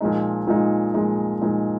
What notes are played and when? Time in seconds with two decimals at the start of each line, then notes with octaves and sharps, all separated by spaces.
0.01 A#2 F3 G#3 D#4
0.47 A#2 F3 G#3 D#4
0.94 A#2 F3 G#3 D#4
1.42 A#2 F3 G#3 D#4